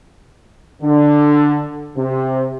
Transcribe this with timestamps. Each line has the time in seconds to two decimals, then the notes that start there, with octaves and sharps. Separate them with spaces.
0.82 D3
1.96 C3